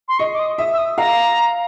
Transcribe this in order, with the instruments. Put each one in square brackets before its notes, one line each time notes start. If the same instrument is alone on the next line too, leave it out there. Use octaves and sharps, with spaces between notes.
[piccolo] C6
[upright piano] D#5 [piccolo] C#6
[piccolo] D6
D#6
[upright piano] E5 [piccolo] D#6
[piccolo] E6
D#6
[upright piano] F5 [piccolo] A#5